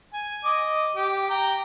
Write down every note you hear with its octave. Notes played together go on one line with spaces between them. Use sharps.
G#5
D#5 D6
G4
G5 A#5